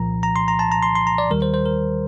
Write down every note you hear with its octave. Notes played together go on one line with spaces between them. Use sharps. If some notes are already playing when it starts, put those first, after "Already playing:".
Already playing: C2 A#2 F3 A#5
A#5
C6
A#5
A5
A#5
C6
C6
A#5
D5
D#2 D#3 G3 A#4
C5
C5
A#4